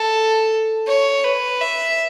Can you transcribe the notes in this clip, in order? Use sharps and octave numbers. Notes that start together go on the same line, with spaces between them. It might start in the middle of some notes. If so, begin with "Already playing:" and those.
Already playing: A4
C#5
B4
E5